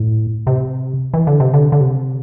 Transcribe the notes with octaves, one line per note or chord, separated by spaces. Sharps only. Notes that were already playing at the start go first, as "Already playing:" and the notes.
Already playing: A2
C3
E3
D3
C3
D3
D3
C3